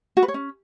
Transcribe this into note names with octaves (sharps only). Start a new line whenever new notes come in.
F#4
B4
C#5
C#4